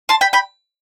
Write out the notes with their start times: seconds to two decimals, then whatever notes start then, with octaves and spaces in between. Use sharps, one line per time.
0.09 A5 C6
0.21 G5 B5
0.33 G5 B5